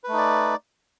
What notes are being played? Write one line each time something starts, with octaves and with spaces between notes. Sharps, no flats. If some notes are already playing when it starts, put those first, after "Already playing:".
A3 D#4 B4 D5